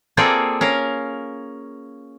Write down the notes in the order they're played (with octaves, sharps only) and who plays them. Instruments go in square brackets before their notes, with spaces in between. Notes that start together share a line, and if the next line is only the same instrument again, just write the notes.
[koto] A#3 C4 F4 G#4 A4 D5
C#4 A#4 F5